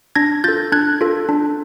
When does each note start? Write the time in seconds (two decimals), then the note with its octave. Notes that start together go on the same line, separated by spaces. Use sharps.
0.15 D4 G#6 A#6
0.44 F4 A4 G6 A6
0.72 D4 F#6 G#6
1.01 F4 A4
1.29 D4